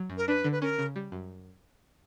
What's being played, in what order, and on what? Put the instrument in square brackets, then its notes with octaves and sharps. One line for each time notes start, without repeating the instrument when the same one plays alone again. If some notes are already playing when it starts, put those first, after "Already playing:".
Already playing: [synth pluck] F#3
F#2
[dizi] A#4
[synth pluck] D4 [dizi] B4
[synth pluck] D3
[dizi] B4
[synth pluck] C#4 [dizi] A#4
[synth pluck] C#3
G3
F#2